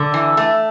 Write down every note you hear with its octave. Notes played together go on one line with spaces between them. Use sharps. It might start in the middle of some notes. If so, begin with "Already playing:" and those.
Already playing: D3
E3
A3